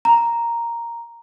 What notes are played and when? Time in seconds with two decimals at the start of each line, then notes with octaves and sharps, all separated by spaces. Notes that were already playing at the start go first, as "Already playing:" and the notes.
0.05 A#5